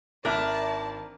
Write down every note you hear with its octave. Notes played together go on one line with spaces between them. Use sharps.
G#1 D4 A#4 D5 E5 A5 F6